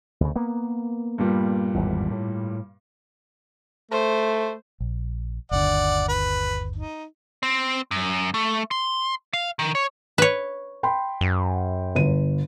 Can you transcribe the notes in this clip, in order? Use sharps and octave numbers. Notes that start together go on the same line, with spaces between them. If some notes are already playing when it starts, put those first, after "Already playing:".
D2 C#3
A#3 B3
G2 A#2 G3
G#1 E2
A2
A3 C5
A#1
G1 D#2 D3 D5 F#5
B4
D#4
C4
F#2
A3
C6
F5
D#3
C#5
B4 C#5
G5 B5 C6
F#2
G1 D#7